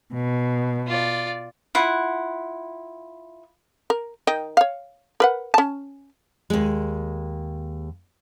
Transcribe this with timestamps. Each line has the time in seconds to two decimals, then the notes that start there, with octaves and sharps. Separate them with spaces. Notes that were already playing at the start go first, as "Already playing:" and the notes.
0.13 B2
0.86 F4 D5
1.75 E4 F4 F#5
3.90 A#4
4.27 D#3 D#5 G5
4.57 C#5 F5
5.20 A#4 B4 F#5
5.54 C#4 A5
6.50 D#2 G#3